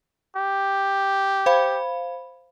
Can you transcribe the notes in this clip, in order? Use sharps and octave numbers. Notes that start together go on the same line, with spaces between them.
G4
C5 F5 B5